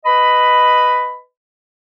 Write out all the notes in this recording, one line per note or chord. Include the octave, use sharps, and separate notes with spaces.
B4 D#5 B5